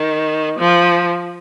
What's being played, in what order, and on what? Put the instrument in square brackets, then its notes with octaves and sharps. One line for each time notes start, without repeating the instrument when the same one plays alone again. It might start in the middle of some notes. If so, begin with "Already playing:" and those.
Already playing: [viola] D#3
F3